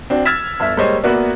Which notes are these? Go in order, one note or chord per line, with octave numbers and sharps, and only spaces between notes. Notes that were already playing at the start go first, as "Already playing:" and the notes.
C4 D4 F#4
E6 F6 G#6 A6 B6 E7
G1 E5
G3 G#3 A#3 C5 C#5 D#5
A#3 B3 F#4 B4 D5 E5